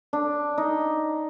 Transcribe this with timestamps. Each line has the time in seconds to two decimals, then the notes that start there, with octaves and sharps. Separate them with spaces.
0.13 D4
0.58 D#4